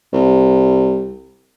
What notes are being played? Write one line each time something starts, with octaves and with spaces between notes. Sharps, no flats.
C2